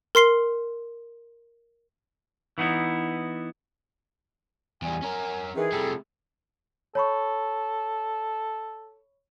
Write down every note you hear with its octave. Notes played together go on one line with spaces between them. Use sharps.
A#4 C6 C7 G7
E3 B3 D#4 E4
E2 G3 G#5
C#4 A#4
D#3 E3 G#4
C3 G3 A3 E4 A4
A4 C#5 B5 C#6